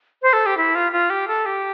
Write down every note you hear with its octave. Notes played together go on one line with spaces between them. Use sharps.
C5
A4
G4
E4
F4
F4
G4
A4
G4